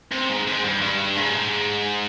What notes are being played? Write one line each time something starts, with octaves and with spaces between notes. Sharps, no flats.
C3
G#2
G#2
G2
G2
G#2